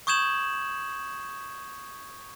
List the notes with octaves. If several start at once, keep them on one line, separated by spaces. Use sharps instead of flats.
C#6 D#6 G6 G#6 E7 F#7